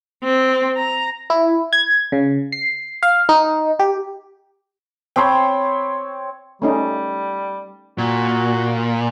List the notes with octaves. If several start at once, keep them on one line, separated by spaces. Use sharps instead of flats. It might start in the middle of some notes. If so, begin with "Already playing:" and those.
C4
A#5
E4
G#6
C#3
C7
F5
D#4
G4
C4 C#5 G5 B5 C6
G3 A3 C#4 D#4
A#2 F#4